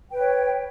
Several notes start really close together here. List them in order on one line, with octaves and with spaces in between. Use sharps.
G5 B4 C#5